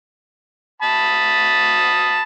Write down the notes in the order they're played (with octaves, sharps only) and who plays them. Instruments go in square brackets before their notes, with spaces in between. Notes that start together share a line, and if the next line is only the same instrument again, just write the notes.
[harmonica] A5 B5 D#6